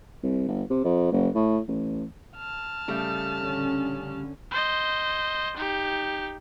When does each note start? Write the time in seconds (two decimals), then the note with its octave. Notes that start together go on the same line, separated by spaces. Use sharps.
0.23 C2
0.48 G1
0.70 C3
0.84 F2
1.12 F#1
1.35 A2
1.68 A1
2.37 A5 F6
2.88 C#3 G3 A3
3.37 D3 C#4
4.51 C5 D#5
5.57 D#4 G4